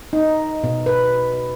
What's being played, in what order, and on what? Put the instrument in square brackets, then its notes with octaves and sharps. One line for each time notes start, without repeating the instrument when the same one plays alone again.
[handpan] D#4
B2
B4